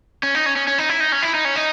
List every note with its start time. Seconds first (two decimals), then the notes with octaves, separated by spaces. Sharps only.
0.23 C#4
0.35 D#4
0.46 C#4
0.56 C#4
0.68 C#4
0.78 D#4
0.89 E4
1.00 D#4
1.12 C#4
1.22 E4
1.35 D#4
1.45 C#4
1.56 D#4